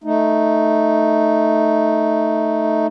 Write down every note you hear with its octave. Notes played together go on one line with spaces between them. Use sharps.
A3 D#4